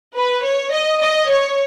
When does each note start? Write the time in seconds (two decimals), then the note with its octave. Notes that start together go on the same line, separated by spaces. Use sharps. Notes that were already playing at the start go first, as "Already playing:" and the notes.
0.17 B4
0.45 C#5
0.73 D#5
1.01 D#5
1.30 C#5